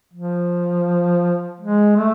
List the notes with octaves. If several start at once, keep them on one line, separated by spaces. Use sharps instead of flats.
F3
G#3
A3